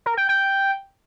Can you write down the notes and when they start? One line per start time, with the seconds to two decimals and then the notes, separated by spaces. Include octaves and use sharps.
0.06 A#4
0.17 G5
0.29 G5